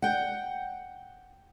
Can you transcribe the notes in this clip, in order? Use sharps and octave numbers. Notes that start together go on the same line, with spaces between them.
F#5 G5